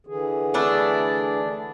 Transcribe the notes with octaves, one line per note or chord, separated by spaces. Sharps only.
D3 E3 G#4
A3 D4 E4